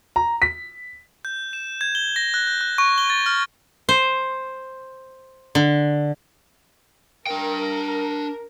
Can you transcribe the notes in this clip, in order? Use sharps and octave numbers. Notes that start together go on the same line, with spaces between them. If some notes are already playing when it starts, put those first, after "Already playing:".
A#5
B6
G6
E7
G#6
G7
A#6
F#6
G6
F#6
C#6
G7
A6
F6
C5
D3
D4 A#4 G5